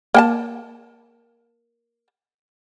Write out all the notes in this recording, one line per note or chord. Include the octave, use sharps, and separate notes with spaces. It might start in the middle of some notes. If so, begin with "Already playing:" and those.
A#3 G5 A5